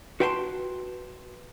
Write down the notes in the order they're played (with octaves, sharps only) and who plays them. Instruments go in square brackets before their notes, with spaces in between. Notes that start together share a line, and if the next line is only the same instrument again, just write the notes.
[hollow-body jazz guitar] F#4 B4 G5 A5 A#5 C6